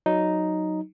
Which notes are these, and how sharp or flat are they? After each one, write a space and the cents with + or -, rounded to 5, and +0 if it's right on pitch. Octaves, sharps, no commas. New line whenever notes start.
F#3 +0 D#4 +0